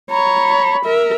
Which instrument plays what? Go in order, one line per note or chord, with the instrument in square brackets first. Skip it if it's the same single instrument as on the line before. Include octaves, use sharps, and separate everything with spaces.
[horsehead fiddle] C#5 [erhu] A#5 [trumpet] B5
[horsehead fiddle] A#4 [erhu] E5